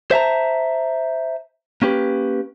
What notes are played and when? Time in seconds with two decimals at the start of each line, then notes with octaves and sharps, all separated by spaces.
0.11 C5 E5 A5 A#5
1.82 A#3 C#4 G4 B4